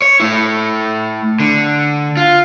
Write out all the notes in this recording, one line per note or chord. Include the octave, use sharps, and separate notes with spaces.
C#5
A3 E4
D3
F4